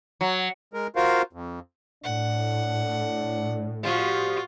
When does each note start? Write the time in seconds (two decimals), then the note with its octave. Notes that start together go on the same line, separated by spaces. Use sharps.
0.21 F#3
0.73 G#3 A#4
0.96 F4 F#4 A#4 C5 F5
1.33 F2
2.04 A2 D4 F#5
3.83 F3 G3 F4 F#4